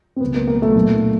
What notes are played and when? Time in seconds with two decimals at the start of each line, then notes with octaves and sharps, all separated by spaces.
0.16 C4
0.20 C#2 B2 B3
0.34 A#3
0.47 A#3
0.62 A3
0.75 B1 A#2